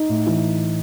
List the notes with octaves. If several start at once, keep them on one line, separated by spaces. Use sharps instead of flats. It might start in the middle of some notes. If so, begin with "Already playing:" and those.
Already playing: D#4
A2
E3